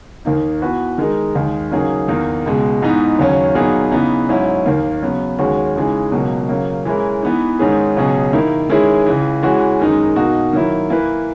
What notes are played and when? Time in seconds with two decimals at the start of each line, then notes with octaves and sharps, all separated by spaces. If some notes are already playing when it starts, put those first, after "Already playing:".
0.25 D#2 D#3 A#3 D#4
0.62 E3 B3 F#4 B4
0.98 D#3 G#3 D#4 A#4
1.35 D#2 D#3 G#3
1.71 C#3 F#3 A#3 D#4 G#4
2.08 E2 D#3 A#3 D#4
2.46 C#2 B2 G#3
2.82 G#2 E3 B3 D#4
3.19 D#2 C#3 F#3 C#4
3.55 A#2 F#3 B3 D#4 G#4
3.91 C#3 E3 B3 D#4
4.29 G#2 F#3 C#4 E4
4.66 D#2 D#3 A#3
5.02 C#3 F#3 B3
5.39 D#2 D#3 G#3 C#4 F#4
5.76 C#3 E3 G#3 D#4 G#4
6.12 C#2 B2 F#3 A#3
6.49 C#3 F#3 A#3
6.85 E3 G#3 C#4 E4 A#4
7.23 E3 B3 D#4
7.59 G#2 D#3 G#3 C#4 G#4
7.97 C#2 B2 F#3 C#4 G#4
8.33 D#3 A#3 E4 A#4
8.70 D#3 G#3 C#4 E4 G#4
9.06 C#2 C#3 E3
9.43 E3 G#3 C#4 F#4
9.80 F#2 D#3 G#3 D#4
10.16 B2 A#3 D#4 F#4
10.53 D#3 F#3 A#3 E4
10.90 E3 A#3 E4 B4